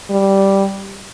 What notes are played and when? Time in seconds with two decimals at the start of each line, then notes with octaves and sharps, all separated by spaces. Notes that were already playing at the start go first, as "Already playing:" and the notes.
0.10 G3